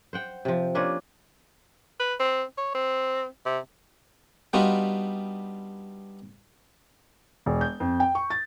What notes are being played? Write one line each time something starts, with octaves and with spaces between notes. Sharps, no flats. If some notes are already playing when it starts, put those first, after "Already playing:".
C5 F#5 G5
C3 F3
A#3 C#4 D4 F4
B4
C4
C#5
C4
C3
G3 B3 D4 D#4 F4 F#4
E1
G6
F2
G5
C#6
A6